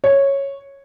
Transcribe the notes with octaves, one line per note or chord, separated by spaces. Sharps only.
C#5